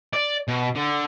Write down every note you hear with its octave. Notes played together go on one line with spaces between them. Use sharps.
D5
B2
D3